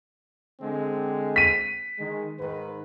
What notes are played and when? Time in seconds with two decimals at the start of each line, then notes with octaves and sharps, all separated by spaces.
0.61 D3 G#3 C4
1.36 B6 D#7
1.99 D#3 G#3
2.39 G#2 D#3 B4